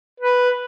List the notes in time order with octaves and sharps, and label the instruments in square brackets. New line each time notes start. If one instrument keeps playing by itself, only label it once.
[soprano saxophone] B4